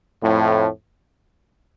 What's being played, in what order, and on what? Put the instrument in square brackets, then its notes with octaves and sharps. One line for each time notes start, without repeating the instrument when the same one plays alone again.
[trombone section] F2 A2